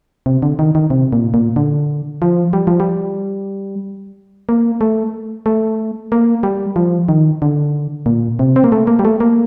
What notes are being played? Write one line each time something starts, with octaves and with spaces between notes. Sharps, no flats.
C3
D3
D#3
D#3
C3
A#2
A#2
D3
F3
G3
F3
G3
A#3
A3
A3
A#3
G3
F3
D#3
D3
A#2
C3
C4
A#3
A3
A#3
G3
A3
A#3